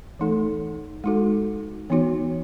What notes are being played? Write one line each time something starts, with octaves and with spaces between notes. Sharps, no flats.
E3 A3 D#4 A4
G#3 D#4 F#4 A4
E3 B3 D#4 F#4 C#5